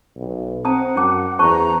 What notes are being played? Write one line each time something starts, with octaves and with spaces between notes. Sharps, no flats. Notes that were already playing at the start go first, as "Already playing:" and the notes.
B1
C4 F#5 A5 A#5 D#6
F#2 C#4 D6
E2 C5 A5 A#5 C#6